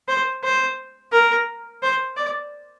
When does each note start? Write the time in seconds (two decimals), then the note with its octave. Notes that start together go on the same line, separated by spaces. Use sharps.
0.08 C5
0.44 C5
1.12 A#4
1.83 C5
2.17 D5